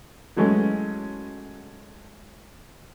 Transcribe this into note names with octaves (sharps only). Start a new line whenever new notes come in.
E3 F#3 G#3 A3 C#4